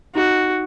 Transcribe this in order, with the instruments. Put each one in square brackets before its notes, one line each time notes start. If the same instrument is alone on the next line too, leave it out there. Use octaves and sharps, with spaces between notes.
[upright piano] D#4 [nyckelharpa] F#4